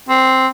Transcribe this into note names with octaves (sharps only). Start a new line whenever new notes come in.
C4